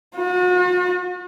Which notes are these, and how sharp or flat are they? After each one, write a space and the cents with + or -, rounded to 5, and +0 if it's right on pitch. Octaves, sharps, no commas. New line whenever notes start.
F#4 -40